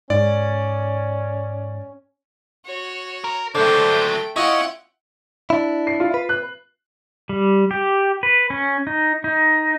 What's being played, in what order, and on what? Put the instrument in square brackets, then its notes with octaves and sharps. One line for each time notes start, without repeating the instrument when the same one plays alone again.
[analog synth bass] G#2 [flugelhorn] C#4 [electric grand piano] D5
[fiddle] F#4 C#5
[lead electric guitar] A#4
[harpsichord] D3 [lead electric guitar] F#3 D4 [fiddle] A3 G5 [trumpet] C5
[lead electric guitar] C#4 C#5 [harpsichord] E4 F4 [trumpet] D#5 [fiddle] F#5 G5
[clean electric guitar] D4 E4
[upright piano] C7
F4
[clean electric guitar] B4
[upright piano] F#6
[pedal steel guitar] G3
G4
B4
C#4
D#4
D#4